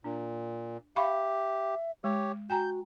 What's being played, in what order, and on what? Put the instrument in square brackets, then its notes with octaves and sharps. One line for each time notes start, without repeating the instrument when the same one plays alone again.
[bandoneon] A#2 [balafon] D4
[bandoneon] G4 [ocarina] E5 [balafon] F5 B5 C#6
[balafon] G#3 [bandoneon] G4 C#5
[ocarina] F#4 [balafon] G5 G#5 A#5 [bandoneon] G6